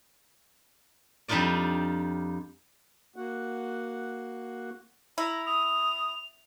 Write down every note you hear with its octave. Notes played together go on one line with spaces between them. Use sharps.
F2 G3 D4 D#4 F4 D5
A#3 F#4 F#5
E4 A#5
D#6 F7